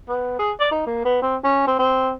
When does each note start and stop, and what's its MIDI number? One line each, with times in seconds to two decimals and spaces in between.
0.09 0.37 59
0.39 0.52 68
0.60 0.68 74
0.71 0.82 63
0.87 1.01 58
1.05 1.18 59
1.22 1.37 60
1.44 1.63 61
1.67 1.78 60
1.79 2.13 60